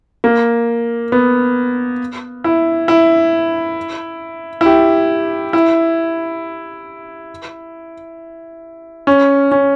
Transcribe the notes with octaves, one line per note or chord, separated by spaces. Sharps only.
A#3
B3
E4
E4
E4
G4
E4
C#4
C#4